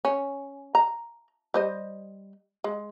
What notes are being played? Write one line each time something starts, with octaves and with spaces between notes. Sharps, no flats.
C#4
A#5
G3 C5 D#5
G#3